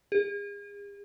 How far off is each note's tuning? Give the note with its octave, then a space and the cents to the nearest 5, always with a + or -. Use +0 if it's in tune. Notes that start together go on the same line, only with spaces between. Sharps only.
G#4 -40